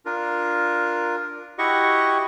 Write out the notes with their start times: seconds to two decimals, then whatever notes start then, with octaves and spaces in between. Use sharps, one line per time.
0.05 D4 F4 A#4
1.58 E4 F#4 G4 D#5 F#5 C#6